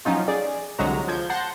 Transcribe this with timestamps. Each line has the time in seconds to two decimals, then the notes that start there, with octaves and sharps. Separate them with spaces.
0.05 F3 F#3 C#4 D#4 F4
0.28 G#4 D5
0.79 C2 D3 F#3 G#3 F#4 A#5
1.08 F3 G6 G#6
1.30 F#5 A5 C6 G6 A#6